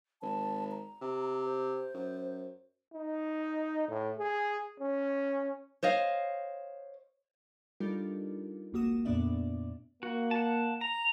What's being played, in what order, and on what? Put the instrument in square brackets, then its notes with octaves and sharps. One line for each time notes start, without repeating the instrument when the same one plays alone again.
[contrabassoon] G#1 [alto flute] A5
[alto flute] A#5
[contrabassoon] C3
[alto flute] C5
[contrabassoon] F#2
[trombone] D#4
A2
G#4
C#4
[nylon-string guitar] C5 C#5 D#5 F5
[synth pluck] G3 D4 D#4 F4 A4 A#4
G#1 C#2 A#3 F#4 D#6 E7
F2 A#2 B3 D4 D5 E5
[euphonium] A#3 [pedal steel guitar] F#4
[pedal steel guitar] F#5 A5
[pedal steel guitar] A#5 [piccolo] F7